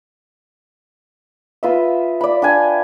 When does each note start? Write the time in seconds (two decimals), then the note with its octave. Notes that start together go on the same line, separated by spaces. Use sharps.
1.63 F4 B4 D#5 E5
2.21 D5 B5
2.42 D4 G5 G#5